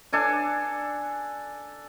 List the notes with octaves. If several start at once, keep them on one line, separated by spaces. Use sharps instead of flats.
D4 A4 G#5 D6